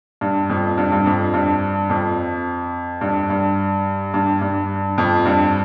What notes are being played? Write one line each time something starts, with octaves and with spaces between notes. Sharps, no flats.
G2
F2
G2
G2
F2
G2
F2
G2
G2
G2
G2
F2
G2